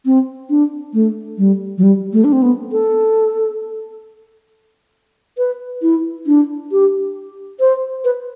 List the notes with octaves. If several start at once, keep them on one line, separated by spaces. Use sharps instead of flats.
C4
D4
A3
G3
F#3
G3
A3
D4
C4
B3
A4
B4
E4
D4
G4
C5
B4